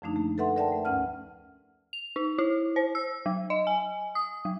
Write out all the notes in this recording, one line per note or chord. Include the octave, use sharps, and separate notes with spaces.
F#2 D3 F3 A3 D4 D#4
A3 A#3
A4 B4 E5 F#5 C6
A#4 D5 E5 F#5 G5 A5
A3
D2 G2 C#4 F#5 F6
F7
D#4
E4
C5
E6
F#3
D#5
G#5
D#6
F#3